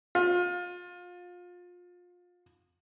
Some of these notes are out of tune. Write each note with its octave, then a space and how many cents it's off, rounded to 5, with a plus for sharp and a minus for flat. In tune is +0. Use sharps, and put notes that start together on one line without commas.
F4 +25